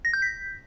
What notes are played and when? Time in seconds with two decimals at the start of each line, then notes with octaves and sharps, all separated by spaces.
0.05 A#6
0.13 G6
0.22 B6